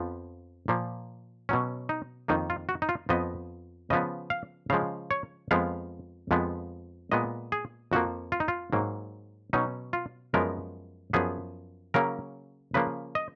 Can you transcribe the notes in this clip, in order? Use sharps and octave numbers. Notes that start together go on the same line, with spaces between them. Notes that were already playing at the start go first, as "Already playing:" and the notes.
Already playing: F2 F3 B3
A#2 F3 A#3
B2 F#3 C#4
D#4
F2 D#3 A#3 D#4
F4
F#4
D#4
F4
F2 F3 B3 D#5
C#3 F3 B3 D#5
F5
C#3 F3 G#3 F5
C#5
F2 F3 G#3 B3 F5
F2 F3 G#3 B3
A#2 G#3 B3 D#5
G#4
F2 F3 A#3 F#4
F4
D#4
F4
G#2 F#3 A#3
B2 F#3 C#4 D#4
F4
F#2 F3 G#3 B3 A#4
F#2 F3 B3 G#4
C#3 F#3 A#3 C#4 A#4
C#3 F3 A#3 B4
D#5